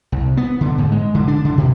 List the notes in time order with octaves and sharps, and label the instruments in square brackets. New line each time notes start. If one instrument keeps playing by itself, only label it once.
[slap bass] C2
B3
D3
G#2
G#3
D3
D4
D3
B2